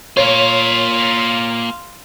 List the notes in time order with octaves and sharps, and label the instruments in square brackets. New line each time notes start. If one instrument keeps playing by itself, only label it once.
[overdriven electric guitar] A#3 F4 [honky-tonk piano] C#5 [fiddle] F5 C6